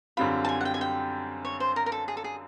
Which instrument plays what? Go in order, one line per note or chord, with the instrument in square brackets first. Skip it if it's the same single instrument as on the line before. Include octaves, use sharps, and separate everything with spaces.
[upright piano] F#2 D3 G3 C4 F4 [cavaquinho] B5
[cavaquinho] A5
G#5
F#5
G5
G#5
G5
C#5
C5
A#4
A#4
A4
G#4
A4
G#4